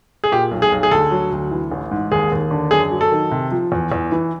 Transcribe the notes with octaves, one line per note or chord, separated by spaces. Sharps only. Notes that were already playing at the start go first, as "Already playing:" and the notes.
G#4
A#2 G4
B1
G#4
B1
G#4
D2 A4
F#3
D2
E3
A1
G#2
D#2 G#4
D#2
D3
F#2 G#4
F#3
A4
D#3
C3
F3
E2
E2
E3